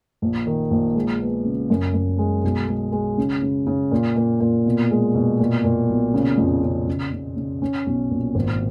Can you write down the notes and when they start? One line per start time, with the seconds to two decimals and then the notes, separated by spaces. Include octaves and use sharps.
0.22 A#1
0.47 D#3
0.71 A#1
0.95 G#3
1.20 B3
1.45 C#3
1.70 F#2
1.94 F#2
2.18 G#3
2.44 B1
2.68 G#3
2.92 G#3
3.18 C#3
3.42 C#3
3.67 C#3
3.91 A#2
4.16 A#2
4.40 A#2
4.66 B2
4.91 G#3
5.14 B2
5.39 A#2
5.64 A#2
5.89 B1
6.14 C#3
6.38 F2
6.63 C#3
6.87 C#3
7.12 C#3
7.36 C#3
7.62 C#4
7.87 B1
8.10 A#2
8.35 G#1